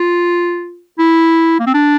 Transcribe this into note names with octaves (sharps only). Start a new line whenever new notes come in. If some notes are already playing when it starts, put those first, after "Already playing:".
Already playing: F4
E4
A#3
C4
D4